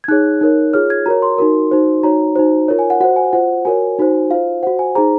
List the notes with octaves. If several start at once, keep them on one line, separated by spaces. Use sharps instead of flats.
G#6
D#4 G#4 C#5 F#6
D#4 A#4 C#5
F4 G#4 C#5 F6
G#6
F#4 A#4 C#5 A#5
C6
D#4 F#4 A#4
D#4 F#4 C5
D#4 F#4 C#5 A#5
D#4 F#4 C5
F4 A#4 C#5
G#5
F#5
F#4 C5 F#5
G#5
F4 C5 F#5
F#4 A#4 C#5 G#5
D#4 F#4 C5
F4 C5 F5
F#4 C5 F#5
G#5
D#4 G#4 C5 A#5